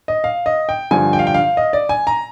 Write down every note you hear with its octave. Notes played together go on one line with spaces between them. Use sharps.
D#5
F5
D#5
G5
G2 D3 F3 G#5
G5
F5
G5
F5
D#5
D5
G#5
A#5